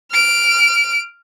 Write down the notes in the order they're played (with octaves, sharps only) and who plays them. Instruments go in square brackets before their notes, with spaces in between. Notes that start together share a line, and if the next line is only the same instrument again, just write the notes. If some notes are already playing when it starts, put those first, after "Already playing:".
[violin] F6 D7